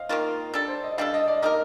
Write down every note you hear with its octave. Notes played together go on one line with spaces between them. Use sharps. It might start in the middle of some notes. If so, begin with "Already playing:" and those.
Already playing: C5 D#5 F5
D#3 A#3 F4
G3 D4 A4
C5
D#5
G3 D4 A4 F5
D#5
D5
A#3 D#4 G4 A#4 D#5